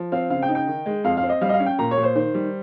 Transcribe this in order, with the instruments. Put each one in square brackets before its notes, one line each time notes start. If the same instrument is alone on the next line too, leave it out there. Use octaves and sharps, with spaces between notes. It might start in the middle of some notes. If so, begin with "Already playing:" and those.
Already playing: [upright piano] F3
C4 F5
C#3 F5
G5
D#4
G5
D#3
G#3
F2 F5
F5
C4
D#5
G3 F5
D#5
F5
C#4
G5
A#2 A#5
C#5
A#2
C5
D#3 C5
G3